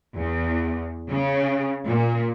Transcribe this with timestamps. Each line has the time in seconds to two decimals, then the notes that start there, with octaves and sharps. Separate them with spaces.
0.15 E2
1.09 C#3
1.86 A#2